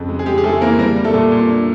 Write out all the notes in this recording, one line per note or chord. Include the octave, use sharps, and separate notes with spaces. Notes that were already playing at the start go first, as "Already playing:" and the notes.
Already playing: F2 C#3
G#3
G#4
G#3 G4
G#4
G#3 A3 A4
E3 A#3 A#4
G3 A#3 A#4
G3
A3 A4
A#2
A#2
D4